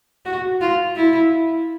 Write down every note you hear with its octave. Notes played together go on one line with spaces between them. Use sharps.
F#4
F4
E4